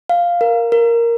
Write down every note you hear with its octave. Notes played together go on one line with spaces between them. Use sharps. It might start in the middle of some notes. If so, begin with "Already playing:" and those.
F5
A#4
A#4